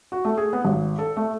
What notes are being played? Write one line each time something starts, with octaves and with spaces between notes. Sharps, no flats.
F#4
A3
G#4
B3
G#1
A4
A3